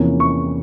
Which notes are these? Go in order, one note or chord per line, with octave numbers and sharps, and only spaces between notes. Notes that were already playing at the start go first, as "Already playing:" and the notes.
Already playing: E2 C3 F3 A#3 C#4
C#6